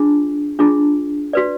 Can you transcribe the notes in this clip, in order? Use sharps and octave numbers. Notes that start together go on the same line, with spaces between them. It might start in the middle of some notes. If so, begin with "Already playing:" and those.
Already playing: D4 F4 G#4
D4 F4 G#4
F#4 B4 D5